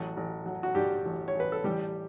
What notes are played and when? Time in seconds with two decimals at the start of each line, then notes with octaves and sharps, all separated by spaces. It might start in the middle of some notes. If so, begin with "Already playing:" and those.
Already playing: A1 F#3 F#4
0.17 A1
0.46 F#3
0.63 F#4
0.75 G2 G3 G4
1.05 A1
1.28 C#5
1.35 A1
1.40 B4
1.52 A4
1.64 A1 G3 G4